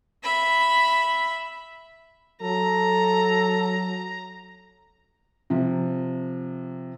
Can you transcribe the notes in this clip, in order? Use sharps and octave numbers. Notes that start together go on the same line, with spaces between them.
E5 B5
F#3 A4 A#5
C3 F3